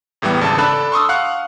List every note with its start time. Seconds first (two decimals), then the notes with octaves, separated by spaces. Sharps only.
0.22 E2 A2 E3 G3 B3
0.41 G#1 C#3 A5
0.58 D4 A4 A5 B5 F#6
0.92 C6 C#6 D#6 E6
1.09 F5 F#5 C#6 F#6